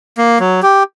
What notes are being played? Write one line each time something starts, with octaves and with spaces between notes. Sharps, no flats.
A#3
F#3
G4